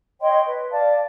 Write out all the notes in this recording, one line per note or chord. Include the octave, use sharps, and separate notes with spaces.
C#5 D#5 G5 C6
B4
D5 F5 A5